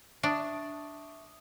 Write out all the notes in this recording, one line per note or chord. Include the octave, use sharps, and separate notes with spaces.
D4 E5 C#6 D#6